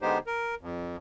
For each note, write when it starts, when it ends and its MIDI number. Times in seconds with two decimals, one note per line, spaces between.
0.01 0.18 50
0.01 0.18 56
0.01 0.18 59
0.01 0.18 63
0.01 0.18 67
0.01 0.18 72
0.27 0.55 70
0.61 0.96 41